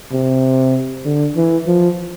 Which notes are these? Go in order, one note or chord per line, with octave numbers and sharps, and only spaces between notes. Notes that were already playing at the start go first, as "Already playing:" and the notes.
C3
D3
E3
F3